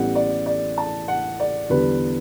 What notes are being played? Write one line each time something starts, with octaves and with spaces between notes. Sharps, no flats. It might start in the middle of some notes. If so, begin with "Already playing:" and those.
Already playing: A1 A2 G3 B3 F#5
D5
D5
A5
F#5
D5
E2 D3 G3 B4